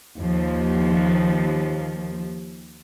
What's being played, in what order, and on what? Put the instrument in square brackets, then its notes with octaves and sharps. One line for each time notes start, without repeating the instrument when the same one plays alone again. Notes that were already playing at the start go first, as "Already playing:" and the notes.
[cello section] D#2 F3